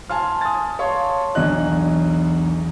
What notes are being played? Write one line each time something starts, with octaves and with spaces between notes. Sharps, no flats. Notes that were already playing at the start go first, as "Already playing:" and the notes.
G#5 A5 C6 F6
D#6 A6
C#5 F5 A5 C6
B1 E2 F#3 D4 D#5 F#6